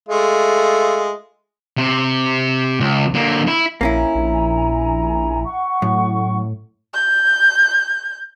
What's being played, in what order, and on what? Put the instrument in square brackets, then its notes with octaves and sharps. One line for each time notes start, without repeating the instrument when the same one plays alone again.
[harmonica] G#3 A3 F4
[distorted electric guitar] C3
C#2
D3 A#3
E4
[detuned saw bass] A#1 [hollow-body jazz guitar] A#3 C#4 E4 [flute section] G#5 A#5
[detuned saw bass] A#1
[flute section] F#5 C#6
[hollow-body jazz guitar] F#2 [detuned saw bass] A2
[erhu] G6